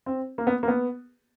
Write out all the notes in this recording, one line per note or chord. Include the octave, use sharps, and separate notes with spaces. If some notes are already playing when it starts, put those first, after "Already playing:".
C4
A#3
B3
A#3
B3